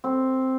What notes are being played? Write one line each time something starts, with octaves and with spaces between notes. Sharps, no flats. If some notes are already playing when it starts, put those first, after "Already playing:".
C4